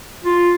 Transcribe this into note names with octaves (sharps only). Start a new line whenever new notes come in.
F4